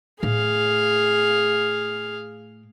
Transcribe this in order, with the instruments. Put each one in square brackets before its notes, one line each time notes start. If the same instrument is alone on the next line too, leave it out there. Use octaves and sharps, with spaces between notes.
[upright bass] A2 [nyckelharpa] G#4 F5